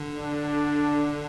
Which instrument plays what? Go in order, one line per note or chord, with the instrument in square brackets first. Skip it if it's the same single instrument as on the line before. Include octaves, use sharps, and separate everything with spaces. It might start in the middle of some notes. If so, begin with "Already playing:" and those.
Already playing: [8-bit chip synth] D3
[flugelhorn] D4